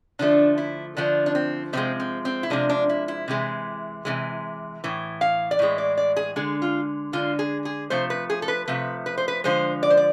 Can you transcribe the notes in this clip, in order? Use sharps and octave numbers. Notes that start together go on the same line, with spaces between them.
D3 F3 A3 D4
E4
D3 F3 A3 D4
D4
C4
C3 F3 G#3 C4
C4
C4
E4
C3 F3 G#3 D4
D4
E4
E4
C3 E3 G#3
C3 E3 G#3
A2 E3
F5
D5
A2 E3 G#3
D5
D5
G#4
D3 G#3 G#4
F4
D3 G#3 F4
G#4
G#4
C3 F3 A3 C5
B4
G#4
A4
B4
C3 F3 A3 B4
B4
C5
B4
D3 F3 G#3 C5
D5
C5
D5